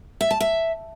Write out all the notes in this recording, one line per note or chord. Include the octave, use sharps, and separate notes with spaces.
E5
A5
E5